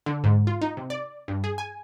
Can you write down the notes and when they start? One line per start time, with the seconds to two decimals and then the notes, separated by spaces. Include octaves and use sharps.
0.06 D3
0.24 G#2
0.47 F4
0.62 D#4
0.77 C3
0.90 D5
1.28 G2
1.44 G#4
1.58 G#5